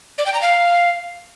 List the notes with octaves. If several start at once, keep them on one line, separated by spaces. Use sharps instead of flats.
D5
G5
A#5
F5